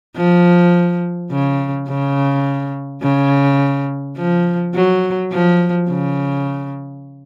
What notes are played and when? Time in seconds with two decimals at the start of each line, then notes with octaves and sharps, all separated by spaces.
0.16 F3
1.31 C#3
1.89 C#3
3.02 C#3
4.17 F3
4.75 F#3
5.32 F3
5.89 C#3